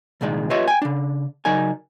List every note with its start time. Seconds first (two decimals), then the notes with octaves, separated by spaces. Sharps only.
0.21 C2 A#2 D#3 G#3 D5
0.50 F4 G4 B4 C#5 D#5 E5
0.68 G5 G#5
0.82 C#3 D4
1.45 C#3 F#3 D#4 A#4 D5 G#5